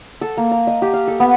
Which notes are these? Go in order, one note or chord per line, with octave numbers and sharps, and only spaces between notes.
A4
A#3
A#5
D#5
G4
F5
A4
B3